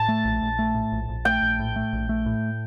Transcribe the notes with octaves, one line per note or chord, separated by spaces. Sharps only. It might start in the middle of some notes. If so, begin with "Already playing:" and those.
Already playing: A2 A5
A3
A#1
A#1
A3
A2
A#1
A#1
A3 G5
A#1
A2
A3
A#1
A3
A2